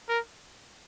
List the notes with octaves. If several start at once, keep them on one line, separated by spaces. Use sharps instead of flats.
A#4